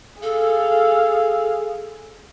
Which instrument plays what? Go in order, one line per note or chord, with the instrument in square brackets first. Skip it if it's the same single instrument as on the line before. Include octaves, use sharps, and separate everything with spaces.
[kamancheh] G#4 F5 [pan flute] A4